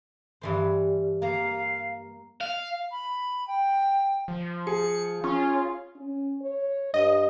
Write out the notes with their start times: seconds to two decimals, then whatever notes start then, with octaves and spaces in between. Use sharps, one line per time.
0.42 G2 E3 C5
1.22 A#3 F5 A#5
2.41 F5
2.91 B5
3.48 G5
4.28 F3
4.67 G#4 C#7
5.24 C#4 F4
5.95 C#4
6.42 C#5
6.94 G2 D#5